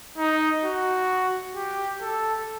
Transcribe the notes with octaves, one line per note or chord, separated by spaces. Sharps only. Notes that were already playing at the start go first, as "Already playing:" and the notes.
D#4
F#4
G4
A4